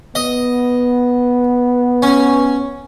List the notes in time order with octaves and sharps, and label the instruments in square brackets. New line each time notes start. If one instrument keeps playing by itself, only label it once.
[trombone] B3 [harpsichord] D#5
[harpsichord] C#4